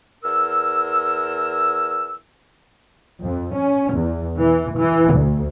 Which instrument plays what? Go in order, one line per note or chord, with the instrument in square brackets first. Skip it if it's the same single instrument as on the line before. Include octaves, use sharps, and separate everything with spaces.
[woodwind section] E2 A#4 E6
[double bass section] F2
C#4
E2
E3
E3
D2